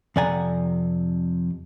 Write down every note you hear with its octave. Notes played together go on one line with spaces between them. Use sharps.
F2 C3 D5 F#5 G#5 A#5